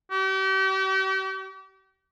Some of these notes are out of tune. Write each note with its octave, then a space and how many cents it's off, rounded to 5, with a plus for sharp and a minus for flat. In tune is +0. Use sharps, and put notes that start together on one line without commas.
G4 -40